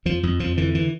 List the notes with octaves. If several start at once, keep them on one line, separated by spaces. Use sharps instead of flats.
F2 F3
F2
F2 F3
D3 E3
E3